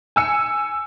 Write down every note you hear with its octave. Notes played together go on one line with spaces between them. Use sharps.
G#5 E6 C#7